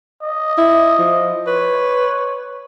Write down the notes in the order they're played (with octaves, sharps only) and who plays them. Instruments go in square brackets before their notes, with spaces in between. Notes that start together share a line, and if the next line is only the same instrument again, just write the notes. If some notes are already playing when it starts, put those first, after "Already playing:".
[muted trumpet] D#5
[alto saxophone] E4
F3
[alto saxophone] B4 [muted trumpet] C#5